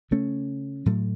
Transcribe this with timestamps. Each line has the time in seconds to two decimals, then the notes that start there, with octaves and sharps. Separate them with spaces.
0.11 C#3 A3 C#4
0.86 A2 F#3 A3